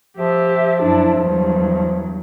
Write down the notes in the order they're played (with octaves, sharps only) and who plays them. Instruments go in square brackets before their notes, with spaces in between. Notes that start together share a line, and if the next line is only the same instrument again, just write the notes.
[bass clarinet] F3 [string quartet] G4 E5
[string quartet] F#2 D4 E4
E2 G2 F#3